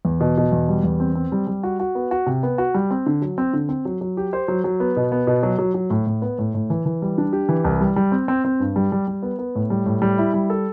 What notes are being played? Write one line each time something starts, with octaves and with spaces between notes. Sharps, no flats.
E2
B2
B2
E2
G3
E2
C4
C4
G3
G3
F#4
F#4
B3
F#4
C3
B3
F#4
G3
C4
D3
F#3
C4
D3
C4
F#3
F#3
G4
C5
F#3
F#3
B3
B2
B3
B2
F#3
F#3
F#3
A2
A2
B3
A2
A2
E3
E3
G3
D4
G4
E3
C2
G3
G3
C4
C4
C4
G2
G3
G3
G3
B3
B3
A2
G3
A2
G3
E4
G3
A4